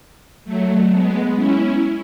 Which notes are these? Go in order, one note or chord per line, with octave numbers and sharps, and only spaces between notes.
F#3 A3
G#3 B3
C#4 E4